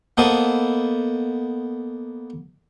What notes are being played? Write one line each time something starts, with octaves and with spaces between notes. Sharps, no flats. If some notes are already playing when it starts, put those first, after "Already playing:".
A#3 B3 A4 C5 D#5